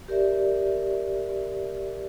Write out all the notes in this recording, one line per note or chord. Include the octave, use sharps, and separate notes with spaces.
G4 A#4 D5 E5